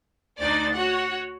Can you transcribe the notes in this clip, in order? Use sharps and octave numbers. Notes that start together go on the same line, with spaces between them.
D2 D4 D#4 C5 D5 A6
F#4 C#5 F#5